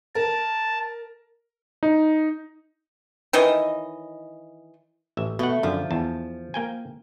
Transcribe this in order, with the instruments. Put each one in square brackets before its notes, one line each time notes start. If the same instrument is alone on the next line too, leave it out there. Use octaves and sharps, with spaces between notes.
[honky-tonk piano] A#4 [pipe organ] A5
[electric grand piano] D#4
[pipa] D#3 E3 C#5 D#5
[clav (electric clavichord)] A1 E5
[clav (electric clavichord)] B2 F#5 [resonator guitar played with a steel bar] A3
[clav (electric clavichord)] F#2 D3 [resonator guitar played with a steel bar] F3
[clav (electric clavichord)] E2 A5
A#3 G5 G#5